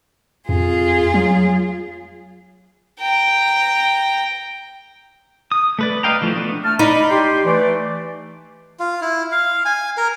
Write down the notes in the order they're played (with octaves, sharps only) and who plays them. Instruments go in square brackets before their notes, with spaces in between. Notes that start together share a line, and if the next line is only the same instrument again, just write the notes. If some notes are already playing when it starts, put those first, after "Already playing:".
[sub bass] F2 [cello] F4 G#4
[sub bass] F#3
[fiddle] G5 A#5
[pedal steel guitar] D#6
A3 B4 D5
B4 D#5 F5 G5 A#5
E3 F3 A3
A3 B3 D4
[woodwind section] A3 A5 F6
[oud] D#4 [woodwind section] D5 B5
[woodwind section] G4 G5 C6
E3 A3 D5
[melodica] F4
E4
F5
G#5
A#4